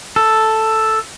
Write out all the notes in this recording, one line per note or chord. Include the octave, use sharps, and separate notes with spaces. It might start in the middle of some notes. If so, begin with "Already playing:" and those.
A4